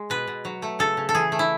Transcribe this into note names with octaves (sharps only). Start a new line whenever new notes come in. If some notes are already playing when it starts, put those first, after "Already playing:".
Already playing: G#3
B2 B4
B2
F#3
A3
C#3 A4
C#3
A4
E3 G#4
A3
E4